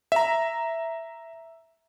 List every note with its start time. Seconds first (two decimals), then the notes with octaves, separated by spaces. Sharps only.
0.12 E5 A#5